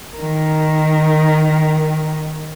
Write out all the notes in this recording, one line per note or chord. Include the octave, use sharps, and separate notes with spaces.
D#3 A#4